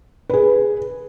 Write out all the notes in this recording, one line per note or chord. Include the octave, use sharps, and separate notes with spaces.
G#4 B4